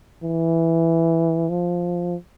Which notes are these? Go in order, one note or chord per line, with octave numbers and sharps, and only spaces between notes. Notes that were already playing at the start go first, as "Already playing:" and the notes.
E3
F3